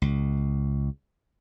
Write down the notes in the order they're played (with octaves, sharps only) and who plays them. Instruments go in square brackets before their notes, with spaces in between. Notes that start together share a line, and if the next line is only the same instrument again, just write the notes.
[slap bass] C#2